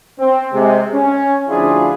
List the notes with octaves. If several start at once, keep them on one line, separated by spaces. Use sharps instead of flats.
C4
C3 G#3
C#4
D2 F3 D4 E4 F4 G#4